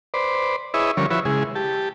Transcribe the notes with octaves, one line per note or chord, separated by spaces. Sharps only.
B4 C5 D5
E4 G#4 B4 C#5 D#5 E5
D3 F3 G3 C#4 A#4 C#5
F3 E4 F#4 B4 C#5 E5
C#3 G#3 E4 G#4
G4 A5